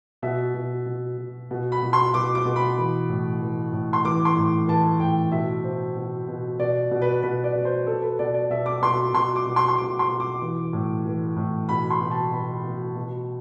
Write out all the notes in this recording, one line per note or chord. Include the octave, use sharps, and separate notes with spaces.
B2 E5
B2
B2
B2
B2
B5
B2
C6
B2 D6
D6
B2
B5
E3
A2
E3
A2
C6
E3 D6
C6
A2
E3 A5
A2 G5
B2 E5
B2 C5
B2
B2
B2 D5
B2
B4
B2 B4
D5
B2
C5
B2 A4
B4
B2 D5
D5
B2 E5
D6
B2 C6
B2 C6
D6
B2
C6
C6
B2 D6
C6
B2
D6
E3
A2
E3
A2
B2 B5
C6
B2
A5
B2 B5
B2
B2